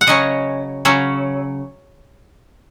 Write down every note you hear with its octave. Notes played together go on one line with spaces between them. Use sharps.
F#5
C#3 F#3 C#4 D#5
C#3 F#3 C#4